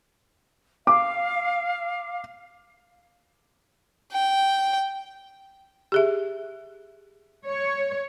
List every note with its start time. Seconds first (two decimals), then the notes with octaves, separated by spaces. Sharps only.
0.87 F5 D6
4.12 G5
5.92 G4 G#4 E5
7.46 C#5